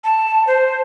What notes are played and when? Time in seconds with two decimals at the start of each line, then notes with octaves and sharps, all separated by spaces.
0.04 A5
0.47 C5